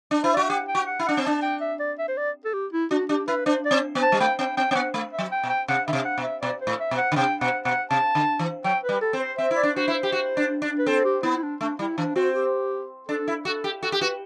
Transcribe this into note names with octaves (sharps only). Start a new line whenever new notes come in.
D4
E4 C5
F#4 D5
E5
G4 F#5
G5
F#4
F#5
E4
D4 F#5
C4
D4 A5
G5
E5
D5
E5
C5
D5
A4
G4
E4
D4 F#4
D4 G4
E4 B4
D4 C5
D5
C4
B3
A5
G3
A3 G5
C4 G5
C4 G5
C4 G5
B3 F#5
A3
E5
F#3
G5
B2
G5
C3 F#5
D3 E5
C3
F#5
B2
E5
B2 D5
C5
A2
E5
B2
F#5
D3
C3 G5
B2 F#5
B2 F#5
C3 A5
D3
E3
F#3 G5
B4
G3
A4
C4
C5
C4 E5
E4
D5
D4
F#4 C5
E4
C5
G4
F#4
D4
D4
B4
C4 A4
G4
B3 E4
E4
D4
A3 D4
G3 E4
E3 D4
C4 F#4
G4
D4 A4
E4
F#4 A4
G4
F#4 A4
G4
F#4 B4